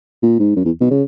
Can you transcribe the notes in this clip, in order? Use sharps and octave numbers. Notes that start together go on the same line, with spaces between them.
A#2
G#2
F#2
E2
B2
C#3